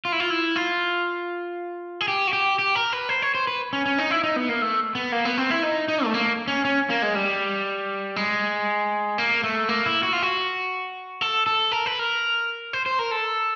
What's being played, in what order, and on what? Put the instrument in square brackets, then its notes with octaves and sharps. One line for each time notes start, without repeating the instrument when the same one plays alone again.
[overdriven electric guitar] F4
E4
F4
E4
F4
G#4
G4
F#4
G4
G4
A#4
B4
C5
C#5
C5
B4
C#4
C#4
D#4
E4
D#4
B3
A#3
A3
B3
A#3
B3
C4
E4
D#4
D#4
A3
A#3
C#4
C#4
A#3
G#3
G3
G#3
A#3
A3
A#3
E4
F#4
F4
F#4
A4
A4
A#4
B4
A#4
C5
C5
A#4
A4